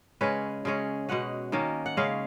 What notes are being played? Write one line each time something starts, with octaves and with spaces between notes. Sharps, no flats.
C#3 G#3 C#4 B4
C#3 G#3 C#4
B2 G#3 C#4 F#5
D#3 A#3 C#4
F#5
C#3 G#3 C#4 F5